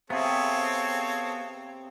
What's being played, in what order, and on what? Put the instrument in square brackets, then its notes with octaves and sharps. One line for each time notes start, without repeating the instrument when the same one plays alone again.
[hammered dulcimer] C3 [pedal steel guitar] B3 G#4 [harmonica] C4 A4 C#5 [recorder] F5